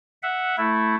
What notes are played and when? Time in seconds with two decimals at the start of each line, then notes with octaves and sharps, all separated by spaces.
0.23 E5 F#5
0.57 A3 E4